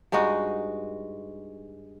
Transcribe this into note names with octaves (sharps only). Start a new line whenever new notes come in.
G2 G#3 D#4 F#4